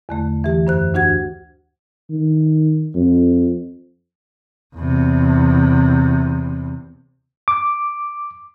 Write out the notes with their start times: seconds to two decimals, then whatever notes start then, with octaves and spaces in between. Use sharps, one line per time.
0.09 E2 D3 A3
0.44 E3 G4
0.67 F#2 C5 F#6
0.94 D2 D4 F#4 F#5 G#6
2.10 D#3
2.95 F2
4.76 E2 C3
7.48 D6